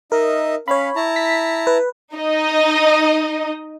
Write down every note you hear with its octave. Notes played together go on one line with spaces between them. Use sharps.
D#4 A#4 D#5 E5
C#4 C#5 F5 B5
E4 A5 A#5
B6
B4
D#4 D#5